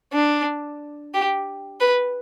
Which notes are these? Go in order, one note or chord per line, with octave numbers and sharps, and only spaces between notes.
D4
G4
B4